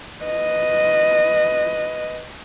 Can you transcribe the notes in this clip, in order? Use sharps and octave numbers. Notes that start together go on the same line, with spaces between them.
B4 D#5